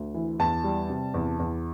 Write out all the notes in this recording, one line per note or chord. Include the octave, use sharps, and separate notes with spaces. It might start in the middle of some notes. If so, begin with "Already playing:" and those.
Already playing: D2
E3
E2 A5
G3
C3
E2
E2